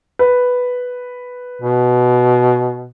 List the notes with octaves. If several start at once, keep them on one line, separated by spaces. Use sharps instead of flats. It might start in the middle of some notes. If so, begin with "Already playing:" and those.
B4
B2